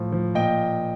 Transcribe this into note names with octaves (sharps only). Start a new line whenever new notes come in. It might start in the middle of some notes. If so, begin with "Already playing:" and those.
Already playing: A2 F3
F3
A#2 D#5 G5